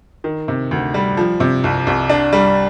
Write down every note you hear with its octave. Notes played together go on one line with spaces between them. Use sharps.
D#3
C3
D2
G3
F3
C3
C2
C2
D4
G3